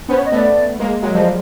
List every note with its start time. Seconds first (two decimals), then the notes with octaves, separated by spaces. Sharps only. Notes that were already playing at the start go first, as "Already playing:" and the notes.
0.09 B3 C#4 C5
0.17 C#5
0.26 D#5
0.32 A3 B3 D5
0.79 G#3 A#3
1.02 F#3 G#3
1.15 F3 G3 D#5